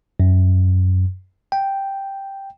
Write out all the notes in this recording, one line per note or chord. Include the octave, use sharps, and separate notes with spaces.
F#2
G5